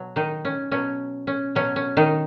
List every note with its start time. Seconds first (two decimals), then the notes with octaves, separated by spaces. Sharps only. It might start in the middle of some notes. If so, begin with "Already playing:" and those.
Already playing: B2 F#3
0.16 D#3 D#4
0.45 C#4
0.72 B2 F#3 C#4
1.27 C#4
1.55 B2 F#3 C#4
1.76 C#4
1.97 D#3 D#4